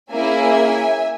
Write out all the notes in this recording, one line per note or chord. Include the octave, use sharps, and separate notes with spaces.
A#3 C#4 E4 G#4 E5 G#5